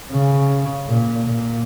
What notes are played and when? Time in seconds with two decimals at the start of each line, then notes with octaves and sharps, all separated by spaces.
0.12 C#3
0.88 A#2
1.26 A#2